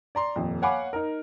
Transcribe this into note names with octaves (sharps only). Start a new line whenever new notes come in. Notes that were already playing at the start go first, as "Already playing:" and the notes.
D5 A#5 C6
D#1 F2
C#5 F5 F#5 G#5 B5 D6
D#4 A#4